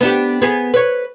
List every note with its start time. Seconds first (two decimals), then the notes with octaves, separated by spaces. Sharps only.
0.01 B3 D4 G4
0.42 B3 G#4
0.74 B4 C#5